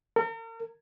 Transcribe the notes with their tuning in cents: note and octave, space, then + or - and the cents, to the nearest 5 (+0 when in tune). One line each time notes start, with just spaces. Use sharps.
A#4 -40